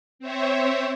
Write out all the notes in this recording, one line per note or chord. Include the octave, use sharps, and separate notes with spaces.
C4 C5 C#5 E5